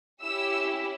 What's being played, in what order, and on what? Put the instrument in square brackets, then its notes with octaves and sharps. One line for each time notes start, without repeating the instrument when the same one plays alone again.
[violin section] C#4 E4 G4 E6